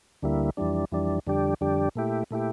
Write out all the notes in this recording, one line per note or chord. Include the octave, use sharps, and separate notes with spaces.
D2 D3 G3 A#3 E4
F2 E3 G3 D4
F2 E3 G3 D4
F2 D3 G3 D4 G4
F2 D3 G3 D4 G4
A#2 A3 E4 G4
A#2 A3 E4 G4